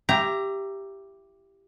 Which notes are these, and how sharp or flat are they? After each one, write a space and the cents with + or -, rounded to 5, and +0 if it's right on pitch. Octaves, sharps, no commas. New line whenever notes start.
E4 +30 G4 +0 A#5 +0